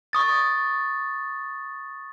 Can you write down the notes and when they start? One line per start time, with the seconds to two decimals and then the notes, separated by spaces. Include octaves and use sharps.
0.13 C#6 D#6 A6